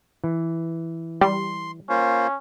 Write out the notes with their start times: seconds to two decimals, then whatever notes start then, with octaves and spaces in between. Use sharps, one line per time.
0.24 E3
1.21 G3 C6
1.89 A#3 C#4 F4 C5